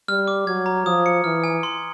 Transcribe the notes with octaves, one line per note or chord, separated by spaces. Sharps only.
G3 F6
D6
F#3 G#6
A#5
F3 D#6
C#7
E3 F6
G#5
C6